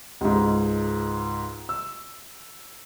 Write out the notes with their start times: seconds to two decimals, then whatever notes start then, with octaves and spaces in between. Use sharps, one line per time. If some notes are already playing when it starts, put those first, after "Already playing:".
0.21 C#2 G#2
1.69 E6